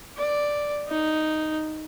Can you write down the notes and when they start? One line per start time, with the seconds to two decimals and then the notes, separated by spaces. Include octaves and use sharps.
0.17 D5
0.88 D#4